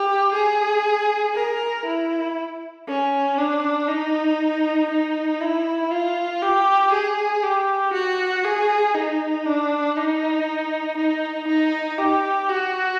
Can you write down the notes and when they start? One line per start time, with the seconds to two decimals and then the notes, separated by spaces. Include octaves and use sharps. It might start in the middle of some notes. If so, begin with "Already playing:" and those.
Already playing: G4
0.34 G#4
1.35 A#4
1.85 E4
2.88 C#4
3.38 D4
3.88 D#4
4.90 D#4
5.41 E4
5.91 F4
6.42 G4
6.93 G#4
7.43 G4
7.94 F#4
8.45 G#4
8.94 D#4
9.45 D4
9.96 D#4
10.97 D#4
11.48 D#4
11.99 G4
12.49 F#4